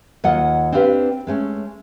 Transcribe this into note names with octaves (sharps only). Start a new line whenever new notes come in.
D#2 F#3 F4 D#5 F#5
C4 D4 G4 B4 F5
G#3 A3 C#4